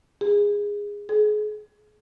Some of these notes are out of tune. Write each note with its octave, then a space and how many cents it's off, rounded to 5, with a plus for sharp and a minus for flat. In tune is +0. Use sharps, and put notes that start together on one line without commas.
G#4 -15
G#4 +35